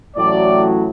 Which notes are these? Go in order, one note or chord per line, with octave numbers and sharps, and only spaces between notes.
A1 A2 F#3 D5